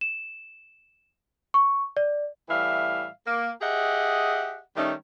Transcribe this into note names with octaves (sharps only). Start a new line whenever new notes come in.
E7
C#6
D5
A2 E3 G3 E5 F5
A#3
G4 G#4 D#5 E5 F#5
D#3 G3 A3 C#4 D#4